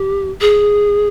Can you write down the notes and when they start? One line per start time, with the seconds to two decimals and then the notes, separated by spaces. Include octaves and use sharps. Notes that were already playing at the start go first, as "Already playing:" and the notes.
Already playing: G4
0.41 G#4